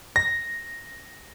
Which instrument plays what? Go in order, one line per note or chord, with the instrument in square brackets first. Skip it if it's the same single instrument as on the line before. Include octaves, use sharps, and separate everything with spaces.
[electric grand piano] A#6